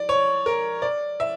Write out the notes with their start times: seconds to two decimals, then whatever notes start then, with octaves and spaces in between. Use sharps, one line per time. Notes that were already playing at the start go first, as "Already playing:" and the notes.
Already playing: D5
0.09 C#5
0.46 A#4
0.82 D5
1.20 E5